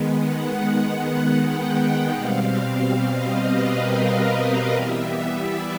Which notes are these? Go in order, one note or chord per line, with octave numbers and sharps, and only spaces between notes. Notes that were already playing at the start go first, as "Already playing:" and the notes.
Already playing: D#3 G#3 B3
F#5
G5
F#5
B2 G3 C4 F5
F5
D#5
B4
A#4
D#5
E3 G3 B3 E5
D5